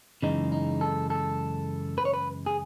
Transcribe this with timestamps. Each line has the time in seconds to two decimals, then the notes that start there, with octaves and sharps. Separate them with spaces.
0.22 F#2 C#3 E3 G#3 D#4
0.52 D#4
0.81 A4
1.10 A4
1.98 B4
2.05 C#5
2.14 B4
2.46 G#4